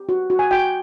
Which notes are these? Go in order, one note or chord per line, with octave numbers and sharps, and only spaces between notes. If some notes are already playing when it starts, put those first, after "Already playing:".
Already playing: G4
F#4
F#4
G#5
F#4 G5